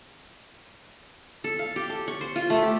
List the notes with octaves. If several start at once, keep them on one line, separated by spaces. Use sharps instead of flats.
A4
F5
G4
A4
C#6
C5
F4
A3
G4